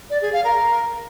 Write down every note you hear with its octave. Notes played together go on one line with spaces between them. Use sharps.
D5
G#4
F5
A#4